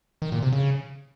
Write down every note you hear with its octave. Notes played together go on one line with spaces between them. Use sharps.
D#3
A#2
C3
C#3